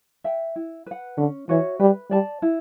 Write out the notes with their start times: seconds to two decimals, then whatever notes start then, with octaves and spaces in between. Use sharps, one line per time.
0.24 E5 G5
0.56 E4
0.86 B4 F#5
1.17 D3 C#4
1.49 E3 F#4 C#5 E5
1.80 G3 B4
2.10 G3 D5 A5
2.42 E4